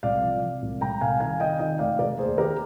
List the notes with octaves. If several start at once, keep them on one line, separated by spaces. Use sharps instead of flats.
C2 D5 F5
F3
F3
C2
C2 G5 A#5
C2 F5 G#5
D#3 F5 G#5
D#3 D#5 G5
D#3 D#5 G5
F1 D5 F5
F1 A#4 D5
D#2 G#4 C5
D#3 G4 A#4